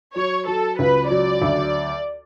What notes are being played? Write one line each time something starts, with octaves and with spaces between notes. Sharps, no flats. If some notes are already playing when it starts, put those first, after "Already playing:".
F#3 C#5
F#3 A4
C#2 B4
F#3 D5
D2